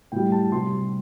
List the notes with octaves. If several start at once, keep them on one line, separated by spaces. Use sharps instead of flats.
A2 G3 G5
A5
C3 G3 C6